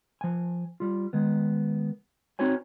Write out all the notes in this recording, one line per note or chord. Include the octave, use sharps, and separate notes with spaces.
F3 G#5
G3 F4
D#3 G#3 B3
C4 D#4 F#4 C#5 G#5